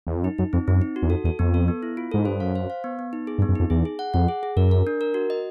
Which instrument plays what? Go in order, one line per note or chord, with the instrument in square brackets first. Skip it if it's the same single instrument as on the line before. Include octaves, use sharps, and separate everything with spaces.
[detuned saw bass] E2
F2
[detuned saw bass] F#2 [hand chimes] D#4
[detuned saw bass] F#2 [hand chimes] D#4
[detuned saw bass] F2 [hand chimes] C4
[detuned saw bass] F#2 [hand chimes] C4
[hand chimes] D#4
F#4
[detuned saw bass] E2
[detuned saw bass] F2 [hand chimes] A4
[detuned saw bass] E2 [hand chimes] A4
[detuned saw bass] F2 [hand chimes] B3
[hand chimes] A4
B3
E4
F4
[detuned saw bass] G#2 [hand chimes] A4
[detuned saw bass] G2 [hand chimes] C5
[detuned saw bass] F#2 [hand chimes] F5
[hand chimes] C5
F5
B3
B3
D#4
G#4
[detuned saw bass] G2
[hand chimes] B3
[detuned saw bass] F#2
[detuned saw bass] F2 [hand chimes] D#4
[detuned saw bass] E2 [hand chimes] G#4
[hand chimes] G#4
F#5
[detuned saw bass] F2 [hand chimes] F#5
[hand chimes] G#4
G#4
[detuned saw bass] F#2 [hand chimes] A#4
[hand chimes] A#4
D4
A#4
F#4
D#5